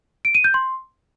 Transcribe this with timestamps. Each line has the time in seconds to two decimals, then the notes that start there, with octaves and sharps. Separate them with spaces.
0.25 D7
0.35 D#7
0.44 G6
0.54 C6